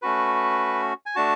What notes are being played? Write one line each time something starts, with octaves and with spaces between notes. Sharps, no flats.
A3 C#4 F#4 B4
G#5
A3 D4 F#4 A5